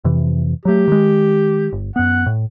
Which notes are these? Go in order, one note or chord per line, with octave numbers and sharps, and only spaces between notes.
F2 C3 E3
F#3 A3 G4
D#3 G#3
G1
F#2 B3 F#5
A2